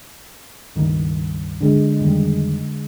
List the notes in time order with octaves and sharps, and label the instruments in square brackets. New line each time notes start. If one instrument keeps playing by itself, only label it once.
[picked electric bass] C#2 G2 D#3
[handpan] D3 G#3
[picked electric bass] F2 D#3 G3